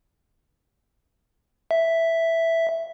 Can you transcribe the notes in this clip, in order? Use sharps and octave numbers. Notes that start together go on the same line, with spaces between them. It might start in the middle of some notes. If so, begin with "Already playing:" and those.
E5